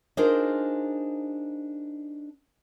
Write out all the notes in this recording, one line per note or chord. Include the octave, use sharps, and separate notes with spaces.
D4 D#4 F4 G#4 A#4 C5